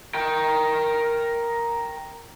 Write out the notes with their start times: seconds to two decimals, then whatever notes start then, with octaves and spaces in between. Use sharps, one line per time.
0.14 A#4 G5